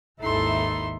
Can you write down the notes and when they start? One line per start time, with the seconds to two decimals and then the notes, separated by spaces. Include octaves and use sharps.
0.21 G#1 D#2 D#4 E4 A4 C6